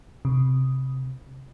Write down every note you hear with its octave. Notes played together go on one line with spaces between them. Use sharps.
C3